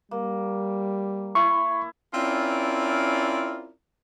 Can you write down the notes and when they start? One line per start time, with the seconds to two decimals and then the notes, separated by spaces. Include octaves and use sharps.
0.11 G3 A#3
1.35 E4 C#6
2.14 C4 C#4 E4 F4 A#4 D5